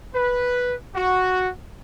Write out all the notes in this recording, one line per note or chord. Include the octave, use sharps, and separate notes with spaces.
B4
F#4